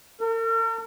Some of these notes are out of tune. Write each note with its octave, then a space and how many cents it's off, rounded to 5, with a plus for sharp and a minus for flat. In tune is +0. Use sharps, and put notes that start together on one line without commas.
A#4 -45